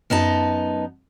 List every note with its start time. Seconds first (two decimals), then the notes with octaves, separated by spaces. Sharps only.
0.10 F#2 B3 D#4 A5